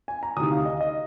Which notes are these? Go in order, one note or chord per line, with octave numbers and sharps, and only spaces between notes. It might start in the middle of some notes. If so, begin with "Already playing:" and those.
G#5
A#5
D2 C3 D#3 D#6
F5
D#5
D#5